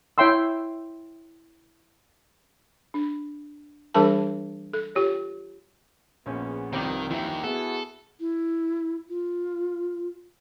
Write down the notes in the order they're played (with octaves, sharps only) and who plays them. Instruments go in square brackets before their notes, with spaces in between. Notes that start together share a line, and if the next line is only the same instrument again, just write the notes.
[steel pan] E4 C#5 E5 G5 C6 E6
[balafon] D4
E3 G3 D4 G#4 A#4 A5
A4
F4 G4 C#5
[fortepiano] A#1 C#4 [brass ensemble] B3 G#4
[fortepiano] C2 G5 D6 [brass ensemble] G2 F3 [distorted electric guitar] D#3
[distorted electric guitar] D#2 D#3 [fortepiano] E3 E4
[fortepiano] B3 [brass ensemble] E4 F#4 G#4 [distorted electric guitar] A4
[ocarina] E4
F4